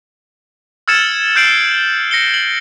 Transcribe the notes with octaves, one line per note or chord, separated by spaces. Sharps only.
E6 F6 G#6 A6 C#7 E7
F6 G6 C7 D7 E7 F#7
A#6 C#7 G7
F#7